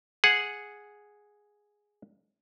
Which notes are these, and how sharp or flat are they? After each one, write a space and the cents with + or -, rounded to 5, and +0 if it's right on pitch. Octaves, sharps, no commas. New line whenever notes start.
G#4 +0 F#5 -10